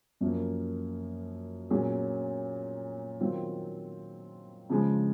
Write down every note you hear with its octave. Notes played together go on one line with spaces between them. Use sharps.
F#2 F3 A#3
A#2 F#3 C#4 G#4
D#3 F#3 C4 F4
C#3 F3 G#3